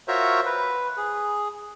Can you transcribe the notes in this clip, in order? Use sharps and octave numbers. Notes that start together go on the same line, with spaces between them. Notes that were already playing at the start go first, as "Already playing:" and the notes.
F4 F#4 A#4 C5 C#5 E5
B4
G#4